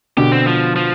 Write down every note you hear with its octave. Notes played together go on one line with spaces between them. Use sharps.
B2 D3 G4
C4
F3
F3